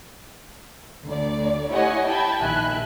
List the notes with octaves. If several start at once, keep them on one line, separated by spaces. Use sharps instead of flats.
D2 D5
E4 G4 C#5 D#5 F#5 G#5
G5 A5 B5 G#6
A#1 D#3 E5 G#5 F#6